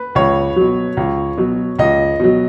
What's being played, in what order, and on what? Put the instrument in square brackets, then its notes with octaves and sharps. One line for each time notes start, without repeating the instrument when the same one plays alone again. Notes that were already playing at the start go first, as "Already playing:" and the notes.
Already playing: [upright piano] B4
[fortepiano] C#2 [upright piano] C#5
[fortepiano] B2 F#3
C#2
B2 F#3
[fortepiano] C#2 [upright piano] D#5
[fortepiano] B2 F#3